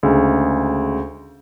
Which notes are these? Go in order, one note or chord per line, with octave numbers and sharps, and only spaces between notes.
D2 C#3 G#3